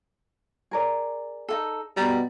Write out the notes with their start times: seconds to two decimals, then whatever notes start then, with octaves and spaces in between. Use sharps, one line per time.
0.71 G#4 A#4 D5
1.49 D#4 F4 A4
1.97 B2 G3 A#5